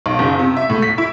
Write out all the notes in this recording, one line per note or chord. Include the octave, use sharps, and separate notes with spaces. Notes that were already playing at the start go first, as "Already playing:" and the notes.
B1
F#1
C3
E5
A2
B6
E4